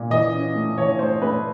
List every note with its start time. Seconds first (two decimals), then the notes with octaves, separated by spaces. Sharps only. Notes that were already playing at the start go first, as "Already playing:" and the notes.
Already playing: A#2
0.10 E3 D#5
0.33 C#4
0.55 A3
0.77 E3 C#5
0.99 A3 C5
1.22 A3 B4